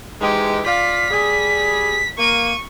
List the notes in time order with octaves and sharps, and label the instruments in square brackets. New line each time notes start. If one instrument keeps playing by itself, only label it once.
[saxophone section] G#2 E3 G#3 [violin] G4
[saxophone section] F4 D5 F5 [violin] B6
[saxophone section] G3 G#4
[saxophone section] A#3 [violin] C#6 D#7